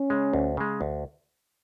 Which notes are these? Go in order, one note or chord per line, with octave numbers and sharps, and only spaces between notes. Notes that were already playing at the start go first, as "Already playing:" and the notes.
Already playing: C#4
C#3 G#3
D2
C#3 G#3
D2